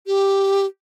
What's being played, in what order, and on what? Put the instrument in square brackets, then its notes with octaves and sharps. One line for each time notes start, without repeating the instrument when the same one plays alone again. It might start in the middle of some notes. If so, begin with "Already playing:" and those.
[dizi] G4